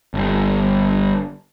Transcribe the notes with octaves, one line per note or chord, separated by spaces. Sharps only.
G1